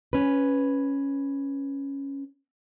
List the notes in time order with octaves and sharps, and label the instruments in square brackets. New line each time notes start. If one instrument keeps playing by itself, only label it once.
[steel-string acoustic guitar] C#4 B4